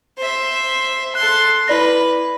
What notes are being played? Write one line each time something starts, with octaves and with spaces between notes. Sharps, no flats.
C5 E5
A4 C6 F#6
E4 B4 D5 A#6